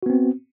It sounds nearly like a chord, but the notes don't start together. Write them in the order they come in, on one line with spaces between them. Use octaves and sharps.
F#4 B3 C4